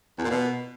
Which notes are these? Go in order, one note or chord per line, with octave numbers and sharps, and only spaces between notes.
E2
A#2
B2